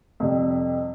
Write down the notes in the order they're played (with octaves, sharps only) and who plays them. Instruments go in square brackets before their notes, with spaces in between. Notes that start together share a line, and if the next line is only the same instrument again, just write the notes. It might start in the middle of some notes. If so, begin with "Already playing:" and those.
[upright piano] F2 C3 G3